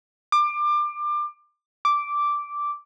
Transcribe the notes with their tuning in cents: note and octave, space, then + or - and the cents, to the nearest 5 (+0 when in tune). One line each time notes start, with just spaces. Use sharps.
D6 +25
D6 -5